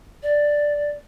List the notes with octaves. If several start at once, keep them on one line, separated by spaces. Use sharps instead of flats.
D5